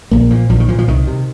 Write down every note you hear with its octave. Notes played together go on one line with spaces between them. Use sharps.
A#1 A#3
A#2 F3
A#1 F3
D#3
A#2 F3
F3
C2 D#3
C3